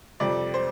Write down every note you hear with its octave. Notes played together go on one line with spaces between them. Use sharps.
F2 C3 G3 D5
C5